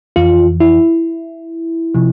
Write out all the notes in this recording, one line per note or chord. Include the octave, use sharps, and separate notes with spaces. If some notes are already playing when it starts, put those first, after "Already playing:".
F2 E3 F4
E4
C3 F3